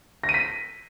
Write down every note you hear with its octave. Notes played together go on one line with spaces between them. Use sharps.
A#6
D#7
B6